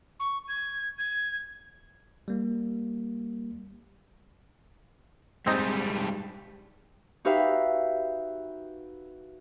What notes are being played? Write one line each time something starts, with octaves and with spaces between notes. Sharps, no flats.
C#6
G#6
G#6
G3 A#3
G#2 G3 C4 D#4
D#4 F#4 G4 B4 E5 F5